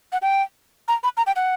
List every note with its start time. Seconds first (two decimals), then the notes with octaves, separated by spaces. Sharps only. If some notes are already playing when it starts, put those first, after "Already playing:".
0.12 F#5
0.22 G5
0.88 A#5
1.04 B5
1.17 A#5
1.27 G5
1.36 F#5